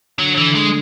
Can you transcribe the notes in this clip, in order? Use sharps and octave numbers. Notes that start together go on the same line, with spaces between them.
D3 F#3
E3
G#3